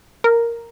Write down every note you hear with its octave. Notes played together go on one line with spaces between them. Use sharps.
A#4